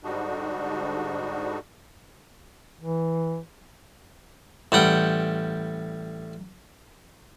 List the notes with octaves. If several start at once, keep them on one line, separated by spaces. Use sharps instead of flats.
G#2 D3 G3 D4 D#4 F#4
E3
A1 G3 F#5 G5